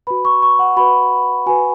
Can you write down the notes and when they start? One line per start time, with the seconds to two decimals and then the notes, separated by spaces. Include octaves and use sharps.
0.07 F#4 B4 B5
0.25 C#6
0.42 C#6
0.59 F#5
0.77 F#4 B4 B5
1.46 F#4 B4 G#5